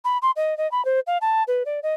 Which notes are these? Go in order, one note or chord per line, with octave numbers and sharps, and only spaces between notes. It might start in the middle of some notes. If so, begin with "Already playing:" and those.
B5
C6
D#5
D#5
B5
C5
F5
A5
B4
D5
D#5